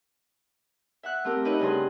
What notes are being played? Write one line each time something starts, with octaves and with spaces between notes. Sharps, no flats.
E5 F#5 F#6
A3 C4 G4 A#4
D#4 B4 C#5 D#5
G2 C#3 G#4 B4 C6